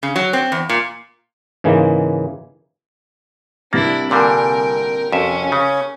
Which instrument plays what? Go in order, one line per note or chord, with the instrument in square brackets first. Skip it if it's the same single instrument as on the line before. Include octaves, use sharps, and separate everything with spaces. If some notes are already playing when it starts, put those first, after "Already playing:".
[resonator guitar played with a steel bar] C#3
F#3
C4
E2
A#2
[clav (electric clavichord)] G#2 C#3 E3 G#3 A#3
[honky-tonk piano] C2 A6 [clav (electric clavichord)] A#3 [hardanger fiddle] D4 E4
[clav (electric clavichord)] A#2 D3 G3 [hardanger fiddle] A#4 G5 [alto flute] G#5
[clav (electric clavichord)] F2 E5 [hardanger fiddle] C#4 [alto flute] F#4
[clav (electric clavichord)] C#3 [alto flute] C#5